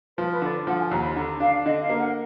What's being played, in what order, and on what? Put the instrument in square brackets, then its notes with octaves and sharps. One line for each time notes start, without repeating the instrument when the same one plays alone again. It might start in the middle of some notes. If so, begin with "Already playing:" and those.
[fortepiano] F3 [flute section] B4
[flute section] B4
[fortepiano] D3 [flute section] D5
[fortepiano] F3 [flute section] F#5
[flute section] G#5
[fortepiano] D#2 [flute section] A#5
[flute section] B5
[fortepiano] D3 [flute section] A#5
[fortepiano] D4 [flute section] F5
[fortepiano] D3 [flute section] D#5
[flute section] F5
[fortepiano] A#3
[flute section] F#5